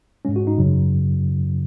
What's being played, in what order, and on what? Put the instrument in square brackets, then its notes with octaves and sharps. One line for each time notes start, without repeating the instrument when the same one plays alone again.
[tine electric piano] G#2 G#3 C#4
F#4
D#4
F#2 C#3 F#3